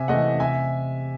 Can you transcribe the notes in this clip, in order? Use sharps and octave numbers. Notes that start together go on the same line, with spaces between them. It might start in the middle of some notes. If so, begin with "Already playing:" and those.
Already playing: C3 E5 G#5
E3 A3 D#5 F#5
C3 E5 G#5